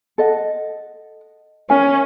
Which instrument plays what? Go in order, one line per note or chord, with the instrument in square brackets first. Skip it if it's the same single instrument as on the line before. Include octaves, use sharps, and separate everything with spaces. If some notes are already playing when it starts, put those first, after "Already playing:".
[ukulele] A4 D#5 F#5
[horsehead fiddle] C#4 [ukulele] A#4 E5 G#5